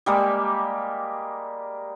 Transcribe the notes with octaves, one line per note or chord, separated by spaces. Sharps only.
G3 G#3 A#3